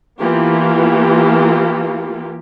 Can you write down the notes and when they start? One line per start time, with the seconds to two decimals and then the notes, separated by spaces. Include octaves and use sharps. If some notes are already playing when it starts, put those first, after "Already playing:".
0.19 E3 A#3 B3 F4 G4